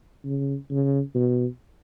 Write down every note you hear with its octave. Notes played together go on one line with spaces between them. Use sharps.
C#3
C#3
B2